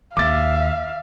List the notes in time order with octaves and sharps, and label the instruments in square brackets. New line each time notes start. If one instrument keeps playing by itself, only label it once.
[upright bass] D#2 [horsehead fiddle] E5 [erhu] F5 [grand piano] D6 A6